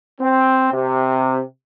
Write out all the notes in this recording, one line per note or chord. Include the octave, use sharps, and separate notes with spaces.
C4
C3